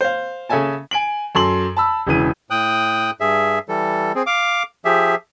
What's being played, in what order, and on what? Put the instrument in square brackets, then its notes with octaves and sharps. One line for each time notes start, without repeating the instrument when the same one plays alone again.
[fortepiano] C5 F5
C#3 A4 E5 G#5 A5
[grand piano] G#5 D7 F#7
F#2 A4 C6 F#7
A5 B5 E6
E1 C#3 E3 D#7
[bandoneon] A2 G5 D#6 F#6
G2 G#4 E5
E3 G3 A4
C4 G#4
F5 D6
F3 G4 G#4 E5